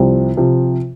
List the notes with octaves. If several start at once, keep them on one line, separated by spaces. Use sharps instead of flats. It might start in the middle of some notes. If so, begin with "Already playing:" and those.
Already playing: C2 C3 F3
C3 F3